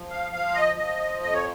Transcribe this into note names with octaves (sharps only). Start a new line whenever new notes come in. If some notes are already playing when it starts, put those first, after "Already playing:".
Already playing: F3
F5
F3 F5
D#5
F3 D#5
F2 D#5
C#5